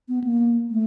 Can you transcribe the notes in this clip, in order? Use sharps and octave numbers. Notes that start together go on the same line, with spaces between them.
B3
A#3
A3